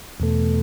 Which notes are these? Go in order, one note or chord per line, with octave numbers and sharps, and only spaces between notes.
E2 B2 A3